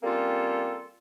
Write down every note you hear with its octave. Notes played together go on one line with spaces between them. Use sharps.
G3 A#3 C4 C#4 F4 A4